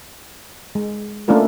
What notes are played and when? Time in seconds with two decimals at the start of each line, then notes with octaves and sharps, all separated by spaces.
0.75 G#3
1.28 A3 A#3 C#4 D4 F4 A#4